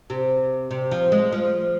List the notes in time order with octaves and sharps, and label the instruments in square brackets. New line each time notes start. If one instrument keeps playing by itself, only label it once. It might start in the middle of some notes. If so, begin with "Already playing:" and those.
[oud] C3
C3
F3
G#3
F3